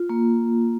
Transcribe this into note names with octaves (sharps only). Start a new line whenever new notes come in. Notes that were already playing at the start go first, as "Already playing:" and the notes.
Already playing: F4
A#3